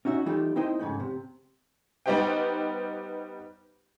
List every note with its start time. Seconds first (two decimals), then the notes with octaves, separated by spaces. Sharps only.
0.05 C#4 D#4 F#4 E5
0.26 E3 G3 A3 D#4 F4 G4
0.56 C4 D#4 E4 C5 D#5 G5
0.79 F2 G#2 C#3 A3 G5
1.00 C3
2.06 G3 B3 D#4 G4 C5 G5